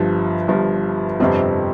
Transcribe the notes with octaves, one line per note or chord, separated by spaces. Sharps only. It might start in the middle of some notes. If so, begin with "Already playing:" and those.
Already playing: G1 G2 F3
G1 G2 F3
G1 F2 C3 F3 C4